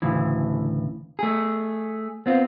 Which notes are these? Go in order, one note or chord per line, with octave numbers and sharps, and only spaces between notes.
D2 A2 C#3 E3
A3 G#4
B3 C4 F4